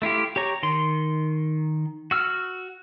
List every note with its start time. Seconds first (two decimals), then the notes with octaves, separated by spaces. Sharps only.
0.02 A3 E4 F4 G4
0.36 G4 C#5 A#5 C#6
0.63 D#3 C6
2.11 F#4 E6 F6